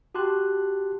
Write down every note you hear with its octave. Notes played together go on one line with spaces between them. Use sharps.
F#4 G4 A5 C6 F#6